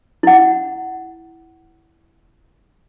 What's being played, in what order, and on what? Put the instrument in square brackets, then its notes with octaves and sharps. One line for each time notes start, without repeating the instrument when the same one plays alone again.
[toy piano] E4 F#5